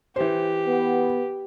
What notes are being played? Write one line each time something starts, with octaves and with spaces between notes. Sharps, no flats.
E3 G4 C5
B3